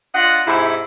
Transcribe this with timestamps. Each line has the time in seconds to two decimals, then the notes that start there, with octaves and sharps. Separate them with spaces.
0.15 D4 F4 D#5 F#5
0.47 G#2 C3 E4